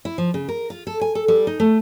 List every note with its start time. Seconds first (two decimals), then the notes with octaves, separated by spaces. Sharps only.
0.05 E4
0.18 F3
0.34 C#3
0.48 A#4
0.70 F4
0.87 A4
1.01 G#5
1.15 A4
1.28 G3
1.47 D#4
1.60 A3